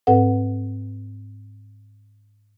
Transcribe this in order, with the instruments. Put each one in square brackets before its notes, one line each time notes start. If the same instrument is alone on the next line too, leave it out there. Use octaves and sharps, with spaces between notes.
[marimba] G#2 C4 A4 B4 F#5